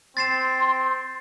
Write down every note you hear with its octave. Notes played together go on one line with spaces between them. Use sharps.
C4 C6 A6 C7 E7